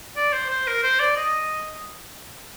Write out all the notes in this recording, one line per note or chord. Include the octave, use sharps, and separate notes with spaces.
D5
C5
C5
A#4
C5
D5
D#5